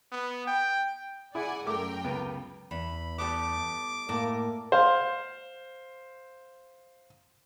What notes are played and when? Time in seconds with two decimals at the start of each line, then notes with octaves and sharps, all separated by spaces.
0.12 B3
0.47 G5
1.35 E4 G#4 D5 F#5 G#5
1.67 F#2 A3 A#4 G5 D6
2.04 C#2 B3
2.71 E2 B5
3.18 G3 A3 B3 D6
4.09 A2 A3 A#3 A#4 D5
4.72 C5 F5